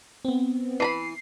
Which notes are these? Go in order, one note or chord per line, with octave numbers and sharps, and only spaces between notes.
B3 C4
E3 A#5 B5 C7